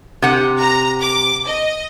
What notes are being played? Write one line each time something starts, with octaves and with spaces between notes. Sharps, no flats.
C3 F#5
A#5
D6
D#5